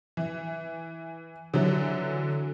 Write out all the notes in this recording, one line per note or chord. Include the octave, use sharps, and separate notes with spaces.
E3
D3 E3 F#3